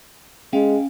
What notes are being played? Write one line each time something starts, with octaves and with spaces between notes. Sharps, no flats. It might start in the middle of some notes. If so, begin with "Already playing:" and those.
G#3 C#4 F5 G5